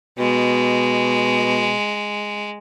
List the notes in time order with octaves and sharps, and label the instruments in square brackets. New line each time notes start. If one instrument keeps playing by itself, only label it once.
[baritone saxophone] B2 [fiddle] G#3